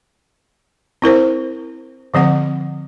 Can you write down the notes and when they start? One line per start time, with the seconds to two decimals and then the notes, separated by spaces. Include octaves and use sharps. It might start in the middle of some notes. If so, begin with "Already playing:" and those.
1.02 C4 E4 A#4 C5
2.14 D3 F3 C4 F#5